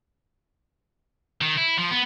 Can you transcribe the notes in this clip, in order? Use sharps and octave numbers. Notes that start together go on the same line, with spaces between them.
D#3
E4
F3
B3